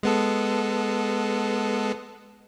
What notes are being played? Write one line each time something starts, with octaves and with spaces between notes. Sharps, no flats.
G#3 B3 A4